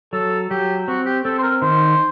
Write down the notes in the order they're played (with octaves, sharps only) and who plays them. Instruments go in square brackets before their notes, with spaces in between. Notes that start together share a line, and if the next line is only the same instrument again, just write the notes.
[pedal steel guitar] F#3 [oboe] A4
[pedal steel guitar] F#3 [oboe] G4
[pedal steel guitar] C4 [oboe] F#4
[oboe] G4
[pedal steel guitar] C4 [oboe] A4
[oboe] C5
A#4
[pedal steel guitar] D#3 [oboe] C5